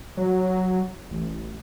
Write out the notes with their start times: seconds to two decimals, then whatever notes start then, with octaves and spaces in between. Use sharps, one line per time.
0.17 F#3
1.11 A1